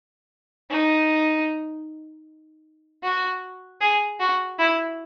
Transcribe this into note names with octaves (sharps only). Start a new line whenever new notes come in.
D#4
F#4
G#4
F#4
E4